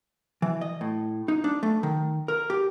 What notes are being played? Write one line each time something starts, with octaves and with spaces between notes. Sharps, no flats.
E3
D#5
A2
D#4
D4
A3
D#3
A#4
G4